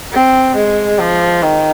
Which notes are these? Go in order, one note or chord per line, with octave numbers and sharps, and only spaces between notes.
C4
G#3
F3
D#3